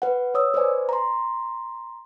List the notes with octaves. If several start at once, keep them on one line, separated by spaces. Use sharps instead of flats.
B4 F#5
C#5 D#6 E6
B4 C5 D5 G#5
A#5 C6